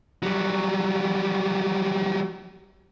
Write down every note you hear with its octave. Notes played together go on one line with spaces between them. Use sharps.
F#3 G3